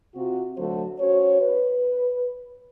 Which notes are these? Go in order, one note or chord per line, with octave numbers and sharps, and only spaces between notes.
C3 C4 F4 F#4
D3 F#3 A3 F#4 A4 C5
C#4 F#4 C5 C#5
B4